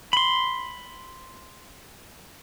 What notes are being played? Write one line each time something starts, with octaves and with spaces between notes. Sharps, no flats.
B5 C6